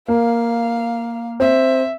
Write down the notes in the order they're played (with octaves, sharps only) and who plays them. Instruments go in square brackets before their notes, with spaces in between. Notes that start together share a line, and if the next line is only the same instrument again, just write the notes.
[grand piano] A#3 [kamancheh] F5
[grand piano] C4 [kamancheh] E5